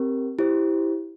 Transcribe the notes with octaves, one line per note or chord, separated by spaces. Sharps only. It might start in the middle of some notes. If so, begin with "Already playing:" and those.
Already playing: C4 G4 A#4
E4 G4 C5